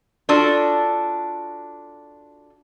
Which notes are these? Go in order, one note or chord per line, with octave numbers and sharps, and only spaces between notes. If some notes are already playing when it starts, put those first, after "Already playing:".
D4 F4 F#4 A4